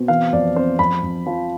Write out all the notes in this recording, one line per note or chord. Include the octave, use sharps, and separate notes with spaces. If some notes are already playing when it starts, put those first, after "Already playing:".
Already playing: B2 C4
E3 F5
F2 D5
C4 C5
F2 B5
F2
F3